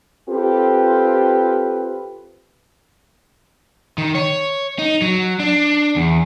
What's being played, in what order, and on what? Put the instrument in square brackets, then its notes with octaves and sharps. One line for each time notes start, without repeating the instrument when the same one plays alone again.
[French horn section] C4 F4 G4 A4 B4
[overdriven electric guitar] D#3
C#5
D#4
F#3
D4
E2